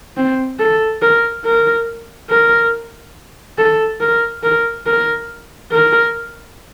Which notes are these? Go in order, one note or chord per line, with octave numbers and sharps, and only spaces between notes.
C4
A4
A#4
A#4
A#4
A4
A#4
A#4
A#4
A#4